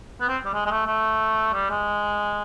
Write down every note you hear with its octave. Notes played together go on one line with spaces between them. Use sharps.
B3
C4
G3
G#3
G#3
A3
A3
G3
G#3